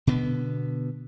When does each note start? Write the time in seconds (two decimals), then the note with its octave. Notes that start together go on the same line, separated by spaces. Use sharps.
0.07 B2 D3 B3